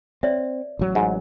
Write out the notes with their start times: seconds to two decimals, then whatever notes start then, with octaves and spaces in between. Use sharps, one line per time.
0.23 C4 C#5 D5 E5
0.79 A1 F#3
0.95 G#2